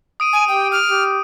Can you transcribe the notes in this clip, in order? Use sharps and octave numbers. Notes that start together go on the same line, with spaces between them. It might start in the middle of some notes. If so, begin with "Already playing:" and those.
D#6 D7 D#7
G#5
G4 G5
F6
G4